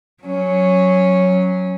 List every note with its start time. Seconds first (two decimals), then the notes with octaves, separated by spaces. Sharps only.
0.23 F#3 C#4